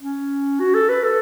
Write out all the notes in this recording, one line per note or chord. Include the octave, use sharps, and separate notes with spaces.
C#4
F#4
A4
B4
A4